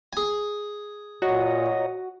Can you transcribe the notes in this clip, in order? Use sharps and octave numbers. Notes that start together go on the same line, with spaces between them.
G#4 G#5
A#2 F#4 C#5 D#5 A#5